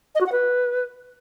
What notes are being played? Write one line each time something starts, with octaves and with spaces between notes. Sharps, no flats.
D#5
F#4
F#5
B4